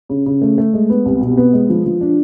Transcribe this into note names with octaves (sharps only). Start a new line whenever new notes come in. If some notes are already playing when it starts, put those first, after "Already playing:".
C#3
C#3
A3
A3
G#3
B3
C2
B2
B3
G#3
F3
F3
D4